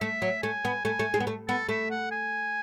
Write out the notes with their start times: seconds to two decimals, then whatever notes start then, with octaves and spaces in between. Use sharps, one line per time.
0.01 A3 E5
0.22 F#3
0.43 A3 G#5
0.65 B3
0.85 A3 G#5
0.99 A3
1.14 G#3
1.20 B3
1.27 A3
1.48 B3 A4
1.69 A3 E5
1.90 F#5
2.11 G#5